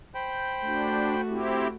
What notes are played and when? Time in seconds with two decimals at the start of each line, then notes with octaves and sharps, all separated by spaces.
0.15 C5 G5 B5
0.66 A3 D4 F#4
1.28 C4 E4 G4